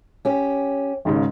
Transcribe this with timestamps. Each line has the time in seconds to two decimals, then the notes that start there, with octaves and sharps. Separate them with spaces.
0.25 C#4 G4
1.05 G#1 G#2 C#3